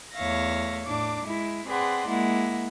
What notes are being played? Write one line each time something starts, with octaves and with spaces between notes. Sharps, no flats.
E2 A3 C#5 E5 F5 A#6
A2 D4 D6
G#3 E4
C4 G#4 B4 D5 F#5 C6
G#3 A#3 E4 F#5